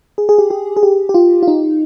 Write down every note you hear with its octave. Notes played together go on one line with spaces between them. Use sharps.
G#4
G#4
G4
G4
G#4
G4
G4
F4
F4
D#4